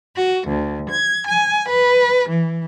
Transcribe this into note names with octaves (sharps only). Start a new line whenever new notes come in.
F#4
D2
G#6
G#5
B4
E3